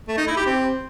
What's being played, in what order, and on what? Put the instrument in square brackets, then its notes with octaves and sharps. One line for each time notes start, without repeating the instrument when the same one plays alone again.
[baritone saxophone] A3
D#4
E4
G4
C4